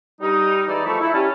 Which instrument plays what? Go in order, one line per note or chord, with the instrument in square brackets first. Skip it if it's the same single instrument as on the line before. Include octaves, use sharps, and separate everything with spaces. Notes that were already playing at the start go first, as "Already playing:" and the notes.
[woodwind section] G3 D#4
E3 G#3 D#4 E4 D5
F3 G#3 A3 A4 B5 C#6
E4
G3 C#4 A5